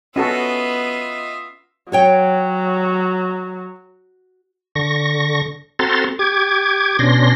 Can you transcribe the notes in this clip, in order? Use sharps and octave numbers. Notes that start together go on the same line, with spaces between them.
B3 C#4 F4 F#4 A4 D#5 E5
F#3 F#4 C#5 G5
D3 C#6 A#6
C4 F#4 A4 A#5 C6 A6
G4 D6 G#6
B2 C#4 D4 C6 A#6